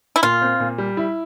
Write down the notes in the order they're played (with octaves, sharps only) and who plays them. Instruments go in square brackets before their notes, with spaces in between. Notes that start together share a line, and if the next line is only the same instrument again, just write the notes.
[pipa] E4
[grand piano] A#2 [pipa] F4
[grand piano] C4
A#2
G3
E4